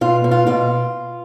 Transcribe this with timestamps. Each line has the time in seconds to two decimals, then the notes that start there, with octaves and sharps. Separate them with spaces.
0.01 B2 F4
0.24 B2
0.31 F4
0.47 B2 F4